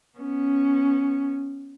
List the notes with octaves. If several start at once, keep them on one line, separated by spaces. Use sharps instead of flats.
B3 C#4